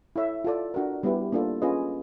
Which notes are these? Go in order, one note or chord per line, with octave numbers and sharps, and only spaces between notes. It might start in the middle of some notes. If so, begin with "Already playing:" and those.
E4 A4 C#5 E5
F4 A4 D5
D4 F#4 A#4
G3 B3 E4 G4 B4
A#3 D4 F4 A4
C#4 F4 G#4 B4 D#5